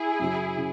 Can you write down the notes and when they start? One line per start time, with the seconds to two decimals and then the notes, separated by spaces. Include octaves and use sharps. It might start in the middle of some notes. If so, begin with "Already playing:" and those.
Already playing: E4 G#4
0.19 F#2 C#3 F#3
0.57 C#3